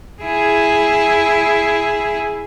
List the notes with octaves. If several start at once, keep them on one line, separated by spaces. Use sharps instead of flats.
E4 G#4